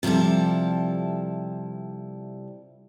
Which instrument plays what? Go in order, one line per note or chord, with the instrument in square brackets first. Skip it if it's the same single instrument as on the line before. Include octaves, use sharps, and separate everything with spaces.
[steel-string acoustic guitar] C3 F3 G3 E4 A4